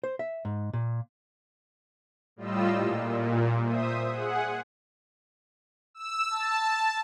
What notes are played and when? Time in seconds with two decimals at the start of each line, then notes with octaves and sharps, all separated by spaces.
0.04 C5
0.19 E5
0.45 G#2
0.73 A#2
2.36 A2 G3 F4 D#5 E6
2.78 A#2
3.62 C5 E5 D#6
4.08 G#4 F#5
5.94 E6
6.31 A5